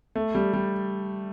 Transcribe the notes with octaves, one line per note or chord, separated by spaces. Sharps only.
A3
G3
G3